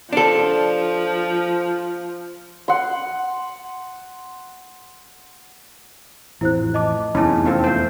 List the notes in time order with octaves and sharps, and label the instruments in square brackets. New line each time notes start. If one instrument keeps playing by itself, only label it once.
[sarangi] F3 [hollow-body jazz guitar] D4 A4
[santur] F#5 C6
[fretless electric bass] A1 F2 [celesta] E4 C5 F#6
[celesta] D#5 A5 D6
[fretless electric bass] F1 E2 [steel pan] C#4 D#4 [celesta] E4 A5
[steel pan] C4 F4 A4
A3 C5